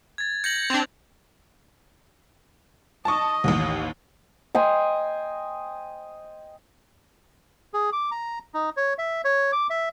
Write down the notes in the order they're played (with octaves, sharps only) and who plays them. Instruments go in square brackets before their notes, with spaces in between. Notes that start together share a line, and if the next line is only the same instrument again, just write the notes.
[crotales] G#6 A6
[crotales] G6 A#6 F#7 [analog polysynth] C#7
[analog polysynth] C4 D4 [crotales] F7
[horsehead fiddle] D#5 [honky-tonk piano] A5 C#6
[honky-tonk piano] A1 D#2
[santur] D#5 G5 G#5 C6
[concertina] G#4
D6
A#5
D#4
C#5
E5
C#5
D6
E5